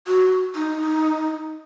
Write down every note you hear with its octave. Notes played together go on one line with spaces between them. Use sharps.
F#4
D#4